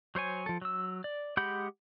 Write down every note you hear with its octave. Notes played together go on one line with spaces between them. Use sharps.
F#3 C5 C#5 G#5
F3 A4
F#3 E6
D5
G#3 G4 F#5 B5 G6